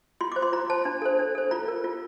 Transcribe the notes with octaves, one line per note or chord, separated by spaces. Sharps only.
F4 C6
D6
C5
C6
F4 A#5
C5 A5
D4
A4 C5
D4
A4 C5
F4 A#5
A#4
F4